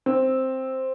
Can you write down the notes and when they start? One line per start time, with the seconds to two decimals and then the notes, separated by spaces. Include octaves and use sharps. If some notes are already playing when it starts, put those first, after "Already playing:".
0.06 C4